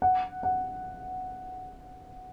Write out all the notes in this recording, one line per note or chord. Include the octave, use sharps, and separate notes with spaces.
F#5
F#5